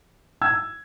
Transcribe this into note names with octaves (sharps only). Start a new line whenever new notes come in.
E6 G#6